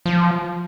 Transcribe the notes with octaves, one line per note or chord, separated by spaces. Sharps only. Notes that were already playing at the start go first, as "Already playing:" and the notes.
F3